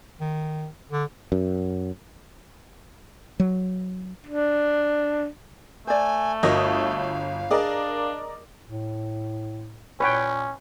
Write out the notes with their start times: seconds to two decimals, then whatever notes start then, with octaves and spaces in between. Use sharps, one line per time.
0.20 D#3
0.92 D3
1.32 F#2
3.40 F#3
4.27 D4
5.87 A3 C5 D5 G#5
6.43 G1 F#4 A#4 D#5 F5 D#6
7.51 D4 G#4 A#4 D5 D#5
8.64 A2
10.00 A#2 C#4 B4 C#5 G5